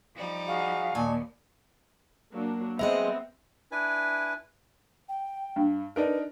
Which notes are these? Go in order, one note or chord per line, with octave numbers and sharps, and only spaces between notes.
F3 G3 D#4
F#4 G#4 F5
D#2 A#2 D#5 G#5 A5 C#6
F#3 A#3 D4
F#3 G#3 B3 C4 D#5 E5
D4 E4 B4 G#5
G5
G2
D4 D#4 A#4 B4